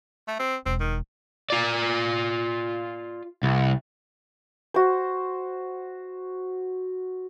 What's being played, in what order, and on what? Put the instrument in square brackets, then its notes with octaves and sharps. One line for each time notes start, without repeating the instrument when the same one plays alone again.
[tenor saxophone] A3
C4
[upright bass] E1 [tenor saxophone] C4
[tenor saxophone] D#3
[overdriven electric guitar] F4 D5
C2
[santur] F#4 C5